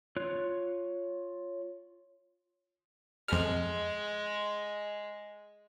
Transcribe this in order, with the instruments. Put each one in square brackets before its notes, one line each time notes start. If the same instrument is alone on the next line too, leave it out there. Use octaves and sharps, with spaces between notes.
[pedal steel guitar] F4 C#5 F#6
[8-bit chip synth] F2 F6 [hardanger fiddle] G#3